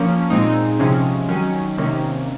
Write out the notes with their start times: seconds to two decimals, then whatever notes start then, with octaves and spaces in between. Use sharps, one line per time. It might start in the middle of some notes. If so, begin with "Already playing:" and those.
Already playing: F3 A#3 C#4
0.30 A#2 G#3 C4 D#4
0.79 C3 F3 G#3 C#4
1.29 D#3 F#3 C#4
1.77 C3 D#3 A#3 C#4